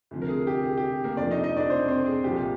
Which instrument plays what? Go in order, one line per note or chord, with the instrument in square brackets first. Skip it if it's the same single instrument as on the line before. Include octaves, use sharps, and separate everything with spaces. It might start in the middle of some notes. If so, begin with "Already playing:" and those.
[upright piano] D2 C3 F3
A#4
G#4
G4
G#4
G4
A#3 A#4
F1 F2 C3 F3 D4 D5
D#4 D#5
D#4 D#5
D4 D5
C4 C5
C4 C5
G#4
C2 A#2 F3 G4